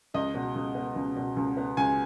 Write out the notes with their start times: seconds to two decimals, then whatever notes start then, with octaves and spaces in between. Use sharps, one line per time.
0.14 C#2 D#5
0.34 B2
0.55 C#2
0.75 B3
0.96 C#2
1.16 B2
1.37 C#2
1.57 B3
1.77 C#2 G#5